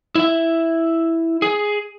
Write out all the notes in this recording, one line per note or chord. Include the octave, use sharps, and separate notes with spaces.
E4 E5
G#4